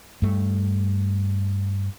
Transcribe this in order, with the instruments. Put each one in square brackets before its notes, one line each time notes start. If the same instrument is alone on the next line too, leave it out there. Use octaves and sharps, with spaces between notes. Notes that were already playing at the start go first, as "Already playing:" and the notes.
[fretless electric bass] G2 A3